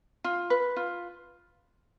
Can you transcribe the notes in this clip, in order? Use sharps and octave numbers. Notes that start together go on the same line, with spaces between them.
F4
B4
F4